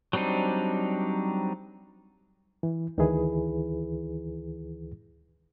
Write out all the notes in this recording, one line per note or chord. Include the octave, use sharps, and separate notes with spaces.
F#3 G3 C4 D4 D#4
E3
D2 D#3 E3 E4 G#4 B4